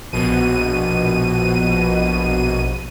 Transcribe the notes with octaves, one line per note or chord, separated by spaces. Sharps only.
A#1 B2 D#7